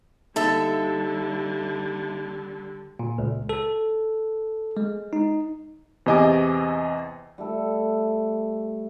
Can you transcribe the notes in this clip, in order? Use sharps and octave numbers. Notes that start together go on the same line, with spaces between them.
D3 G3 A#3 D#4 A4 E5 A5
A#2
C#2
A4
G#3
D#4
E2 C3 D#5 G#5 D6
G3 A3 A4